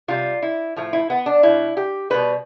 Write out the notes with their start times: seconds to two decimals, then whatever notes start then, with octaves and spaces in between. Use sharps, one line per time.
0.08 C3 G3 F4
0.42 E4
0.76 A2 F3 A3
0.93 E4
1.10 B3
1.26 D4
1.43 B2 G3 E4
1.77 G4
2.10 B2 G3 B4